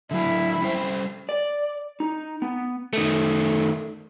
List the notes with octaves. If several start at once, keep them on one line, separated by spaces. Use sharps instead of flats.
D3 F#3 D4 E4
G3 C#4 C5
D5
D#4
B3
D#3 A3